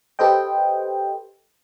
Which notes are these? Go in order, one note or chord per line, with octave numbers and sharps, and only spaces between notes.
G4 A4 B4 C5 D#5 G5